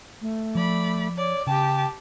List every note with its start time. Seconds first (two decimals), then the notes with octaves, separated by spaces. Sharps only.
0.22 A3
0.55 F3 D5 B5
1.17 C#5 D5
1.47 C#3 G4 G5 A5